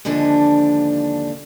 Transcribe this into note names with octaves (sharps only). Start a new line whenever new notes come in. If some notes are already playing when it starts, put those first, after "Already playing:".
D#2 G#2 D3 F3 D4